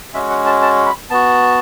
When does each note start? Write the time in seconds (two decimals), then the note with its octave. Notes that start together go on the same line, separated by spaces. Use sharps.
0.14 G#3 C#4 F#4 E5
0.30 F#5
0.46 A5
0.62 A5
0.86 B5
1.10 B3 F#4 A5